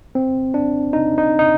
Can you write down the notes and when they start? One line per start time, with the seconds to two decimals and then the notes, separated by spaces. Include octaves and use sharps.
0.15 C4
0.54 D4
0.93 D#4
1.18 D#4
1.39 D#4